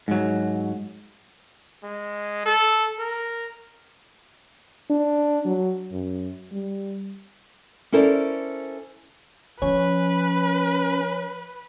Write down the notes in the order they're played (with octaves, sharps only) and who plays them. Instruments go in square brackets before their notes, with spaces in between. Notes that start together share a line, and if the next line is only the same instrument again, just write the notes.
[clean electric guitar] G#2 F#3
[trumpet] G#3
A4
A#4
[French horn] D4
F#3
F#2
G3
[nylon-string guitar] C#4 E4 A4 A#4 C5 D5
[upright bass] F3 [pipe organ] C#4 [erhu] B4 [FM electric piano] C#5